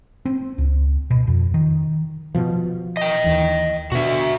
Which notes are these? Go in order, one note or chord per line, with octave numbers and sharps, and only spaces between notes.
C4
C#2
B2
F2
D#3
B2 F3
D#5 G5
D#2 E3
B2 D3 F#4 E5